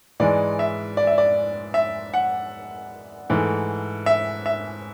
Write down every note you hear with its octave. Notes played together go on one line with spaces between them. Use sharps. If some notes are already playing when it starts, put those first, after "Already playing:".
G#2 E3 G#3 D5
E5
D5
E5
D5
E5
F#5
G#2 E3 A3
E5
E5